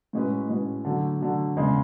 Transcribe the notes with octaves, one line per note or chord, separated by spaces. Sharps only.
A2 G#3 C#4 F#4 B4
A2 G#3 C#4 F#4 B4
D3 F#3 A3
D3 F#3 A3
E2 C#3 G#3